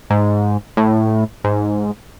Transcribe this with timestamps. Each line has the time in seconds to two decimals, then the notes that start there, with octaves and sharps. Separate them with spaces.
0.10 G#2
0.77 A2
1.44 G#2